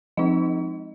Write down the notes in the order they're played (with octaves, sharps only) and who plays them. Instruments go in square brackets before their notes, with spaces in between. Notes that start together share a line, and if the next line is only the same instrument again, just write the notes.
[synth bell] F3 G#3 C4 D#4 D#5